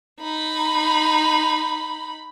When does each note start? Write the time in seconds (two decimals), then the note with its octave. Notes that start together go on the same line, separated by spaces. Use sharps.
0.21 D#4 B5